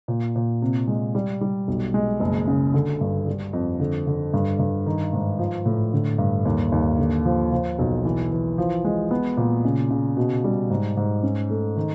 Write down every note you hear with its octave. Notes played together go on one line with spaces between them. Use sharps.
A#2
A#2
C3
G#3
G3
G3
B1
G#3
F#1
C#3
D3
G2
G3
F2
D3
D3
G2
G2
D#3
G#2
F3
A2
D3
G2
D#2
D#2
D3
F3
F3
B1
E3
E3
F3
G#3
B3
A#2
C#3
C#3
B2
G3
G#2
G#2
C#4
A3
D#3